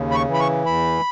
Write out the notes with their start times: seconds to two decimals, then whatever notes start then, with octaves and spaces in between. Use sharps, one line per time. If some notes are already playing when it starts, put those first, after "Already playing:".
Already playing: D#2 C#3
0.11 B5
0.15 C#6
0.27 E3
0.34 B5
0.40 C#6
0.65 E2 B5